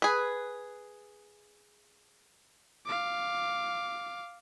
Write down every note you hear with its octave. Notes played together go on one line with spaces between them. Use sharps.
G#4 B4
F5 D6